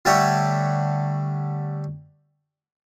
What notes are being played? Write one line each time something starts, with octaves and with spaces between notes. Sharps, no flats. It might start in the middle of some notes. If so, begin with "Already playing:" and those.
D3 G3 A3 D4 G4 C#5